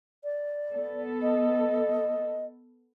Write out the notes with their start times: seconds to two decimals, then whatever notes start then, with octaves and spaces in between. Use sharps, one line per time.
0.24 D5
0.73 B3 A4
1.22 D#5